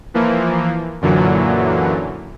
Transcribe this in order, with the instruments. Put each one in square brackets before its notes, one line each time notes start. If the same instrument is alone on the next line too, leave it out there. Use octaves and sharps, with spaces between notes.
[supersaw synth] E3 F3 A#3
F#2 A#2 D3 E3 F#3